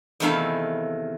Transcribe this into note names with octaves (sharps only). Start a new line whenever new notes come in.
E2 C3 D#3 A3 F5 B5